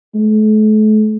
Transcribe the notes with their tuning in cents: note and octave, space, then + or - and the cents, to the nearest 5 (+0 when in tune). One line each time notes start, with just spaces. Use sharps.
A3 -40